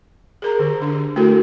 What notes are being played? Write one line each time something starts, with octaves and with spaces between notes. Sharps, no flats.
G#4 A#4 A#5
D3 G4
D4
A3 E4 F#4 A4 A#4